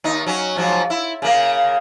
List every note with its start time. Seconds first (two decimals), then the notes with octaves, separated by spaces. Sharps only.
0.04 D#2 D#4
0.26 F#3 C#4
0.56 G#2 F3 F#3
0.90 E4
1.22 C#3 A#3